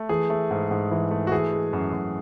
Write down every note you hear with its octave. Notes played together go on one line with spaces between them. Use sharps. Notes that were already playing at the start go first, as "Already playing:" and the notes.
Already playing: A3
E3 G#4
A3
G#2
G#2
E3
A3
F#4
E3 G#4
G#3
F#2
F#2